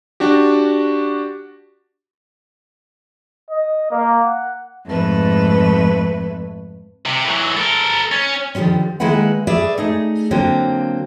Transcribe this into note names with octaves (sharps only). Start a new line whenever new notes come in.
D4 F#4 G4
D#5
A#3
F#5
F2 G#2 A3 B4
C3
E3 F#3
A4 A#4
C#4
D3 D#3 F3 G3 C#4
D#3 G#3 A#3 E4 B4 F#5
G#4 B4 D5 E5
A3 D#4 G#4
D3 F#3 A#3 C4